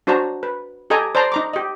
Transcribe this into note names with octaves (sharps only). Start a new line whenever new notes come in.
D4 F#4 C5 A5 A#5
B4
G4 A4 D#5 G#5 A#5
C5 D5 A5 A#5 C6
D#4 A#5 D6
G4 D#5